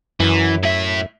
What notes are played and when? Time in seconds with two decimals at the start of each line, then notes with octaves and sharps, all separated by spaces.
0.20 F#2 E3
0.63 A2 E5